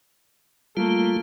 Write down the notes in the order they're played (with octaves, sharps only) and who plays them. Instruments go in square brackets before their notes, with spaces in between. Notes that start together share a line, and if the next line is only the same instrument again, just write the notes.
[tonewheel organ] G3 F4 [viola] A3 A#3